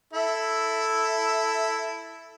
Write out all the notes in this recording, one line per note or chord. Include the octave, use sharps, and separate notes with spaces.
E4 A4 E5